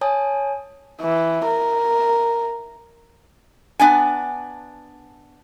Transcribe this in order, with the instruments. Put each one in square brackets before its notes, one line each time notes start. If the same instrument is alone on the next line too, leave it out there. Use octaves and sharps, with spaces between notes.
[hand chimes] C#5 G#5 A5 D#6
[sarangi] E3
A#4
[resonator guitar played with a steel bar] B3 D4 G#5